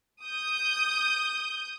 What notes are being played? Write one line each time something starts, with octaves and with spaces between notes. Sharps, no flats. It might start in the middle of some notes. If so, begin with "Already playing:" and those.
D#6 G6